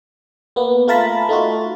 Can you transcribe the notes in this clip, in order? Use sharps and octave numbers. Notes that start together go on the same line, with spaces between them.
A#3 B3
A3 F4 A#4 A5 B5
A3 D#4 F4 F#4